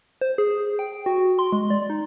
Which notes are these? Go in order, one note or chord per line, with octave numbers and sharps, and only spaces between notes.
C5
G#4
G5
F#4
C6
G#3
D5
D#4